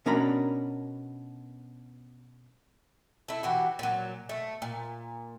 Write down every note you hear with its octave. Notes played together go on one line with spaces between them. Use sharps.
B2 C#4 D4 A#4 A#5 B5
A3 E4
E3 F#4 G4
A#2 F#3
A3
A#2